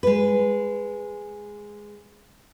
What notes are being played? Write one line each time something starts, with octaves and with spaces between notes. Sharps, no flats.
G#3 B4